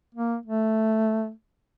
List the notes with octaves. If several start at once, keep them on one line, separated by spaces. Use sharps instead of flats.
A#3
A3